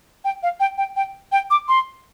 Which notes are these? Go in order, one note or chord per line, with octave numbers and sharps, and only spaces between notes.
G5
F5
G5
G5
G5
G5
D6
C6